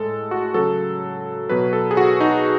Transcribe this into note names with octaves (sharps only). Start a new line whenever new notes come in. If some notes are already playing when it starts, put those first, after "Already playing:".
Already playing: A2 G#3 A4
F#4
C#3 F#3 A4
B2 F#3 B4
A4
G#4
F#4
D#4